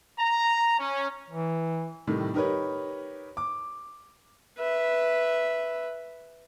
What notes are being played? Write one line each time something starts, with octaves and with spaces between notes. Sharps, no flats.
A#5
C#4
E3
A2 C3 D#3 G3
D#4 G4 A#4 B4 C#5
D6
B4 E5